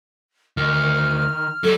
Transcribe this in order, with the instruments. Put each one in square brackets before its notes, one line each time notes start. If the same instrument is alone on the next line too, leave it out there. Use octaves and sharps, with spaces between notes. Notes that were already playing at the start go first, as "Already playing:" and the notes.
[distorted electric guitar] D2 [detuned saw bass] D#3 [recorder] F6
[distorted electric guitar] F#3 G3 [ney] A4